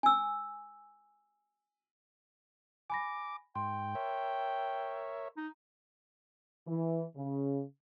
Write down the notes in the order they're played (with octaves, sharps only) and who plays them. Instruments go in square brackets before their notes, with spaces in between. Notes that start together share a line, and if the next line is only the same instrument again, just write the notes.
[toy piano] G#5 E6
[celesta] G#5 B5 A#6 [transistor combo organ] D6
[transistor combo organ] G#2 [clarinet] G5 [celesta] C6
[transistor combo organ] A#4 C#5 E5
[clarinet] D#4
[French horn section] E3
C#3